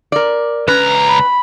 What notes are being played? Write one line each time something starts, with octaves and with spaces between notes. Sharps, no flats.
A#4 D5
C#2 C#4 B4 A#5
B5